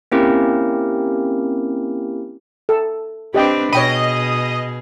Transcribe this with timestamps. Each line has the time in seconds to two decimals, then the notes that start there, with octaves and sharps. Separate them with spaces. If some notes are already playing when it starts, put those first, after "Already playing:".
0.12 A#3 C4 C#4 E4 G4 A#4
2.69 A4
3.34 C4 D4 G4 B4 D#5 G5
3.73 B2 G#4 C#5 D#5 G5 B5